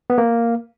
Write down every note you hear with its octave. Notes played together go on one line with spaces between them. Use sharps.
B3
A#3